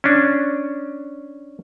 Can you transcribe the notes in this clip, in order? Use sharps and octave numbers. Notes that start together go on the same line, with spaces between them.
C#4 D4